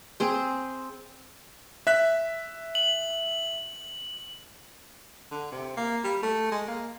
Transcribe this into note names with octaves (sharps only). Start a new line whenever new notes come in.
C4 G#4 C5
E5 F#6 B6
F#7
D3
C3
A#3
G3
A3
G#3
A#3